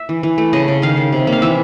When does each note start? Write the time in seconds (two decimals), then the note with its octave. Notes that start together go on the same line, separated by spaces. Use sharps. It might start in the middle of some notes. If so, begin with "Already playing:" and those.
Already playing: E5
0.09 E3
0.23 E3
0.38 A3
0.53 C#3 D#5
0.68 C#3
0.82 D#3 F5
0.97 D#3
1.12 C3
1.27 A#3
1.33 F5
1.42 E3 E5